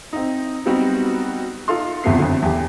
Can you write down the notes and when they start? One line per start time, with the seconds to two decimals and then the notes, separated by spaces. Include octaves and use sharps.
0.13 C4 D#4
0.65 F#3 G3 B3 C4 D#4 F#4
1.68 D#4 F4 A4 F5 C6
2.04 G1 E2 C3 A3 B3 C7
2.18 F2 D3
2.42 E2 E3 G4